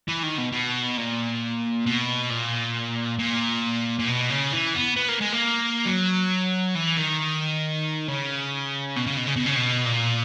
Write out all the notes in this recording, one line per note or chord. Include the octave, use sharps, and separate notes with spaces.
E3
D#3
B2
B2
A#2
B2
A#2
A#2
A#2
B2
C#3
E3
B3
B3
A#3
G#3
A#3
F#3
E3
D#3
C#3
B2
C#3
B2
C#3
B2
C#3
B2
A#2